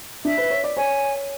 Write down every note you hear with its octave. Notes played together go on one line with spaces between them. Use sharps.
D4 E5
B4
C#5
D5
C#5 G#5